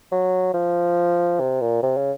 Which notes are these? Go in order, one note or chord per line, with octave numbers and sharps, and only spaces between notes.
F#3
F3
C3
A#2
C3
C#3